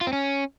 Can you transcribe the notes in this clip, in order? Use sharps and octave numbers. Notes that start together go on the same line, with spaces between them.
F4
C4
C#4